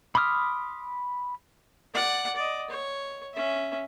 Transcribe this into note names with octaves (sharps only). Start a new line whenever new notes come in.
B5 C6 D6 D#6 F6
D5 F#5
D5 D#5
C#5
C#4 E5